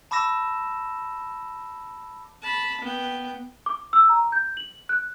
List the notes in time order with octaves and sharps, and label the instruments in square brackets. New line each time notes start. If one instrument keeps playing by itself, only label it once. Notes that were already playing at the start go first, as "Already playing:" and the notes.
[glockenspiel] A5 B5 D6 E6 A#6 E7
[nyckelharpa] A5 B5
B3 G5
[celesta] D6
E6
A#5
G6
F#7
F#6